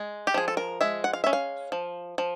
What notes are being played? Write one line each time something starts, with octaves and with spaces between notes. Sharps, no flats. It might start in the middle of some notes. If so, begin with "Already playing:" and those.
Already playing: G#3
G4
F3 G#4
A4
A#4
G#3 E5
F#5
F5
C#4 E5
F5
F3
F3